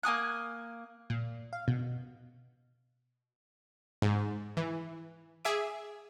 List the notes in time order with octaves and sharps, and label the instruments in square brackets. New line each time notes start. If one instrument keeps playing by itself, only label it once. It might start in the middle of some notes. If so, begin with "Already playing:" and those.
[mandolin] A#3 G#5 D#6 F#6
[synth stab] A#2
F5
B2
[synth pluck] G#2
E3
G#4 E5 D6